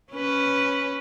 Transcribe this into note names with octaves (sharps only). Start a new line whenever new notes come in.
C#4 B4